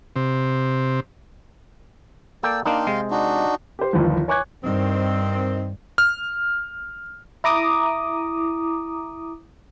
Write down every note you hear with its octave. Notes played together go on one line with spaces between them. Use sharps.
C3
A#3 A4 D5 G5 E6
A#3 D4 D#4 F5 G5 C6
C3 G#3
D4 D#4 F#4
G4 C5
G1 D#2 E3 F3
C#5 G#5 C#6 D6 F#6 G#6
G2 D#3 C4
F6
E4 A#5 D6 D#6